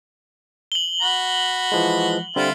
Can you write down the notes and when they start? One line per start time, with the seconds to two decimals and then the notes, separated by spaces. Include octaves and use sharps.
0.72 F#7 G7
1.01 F#4 B5
1.72 E3 F3 G#3
2.36 D3 G3 C4 E4 F4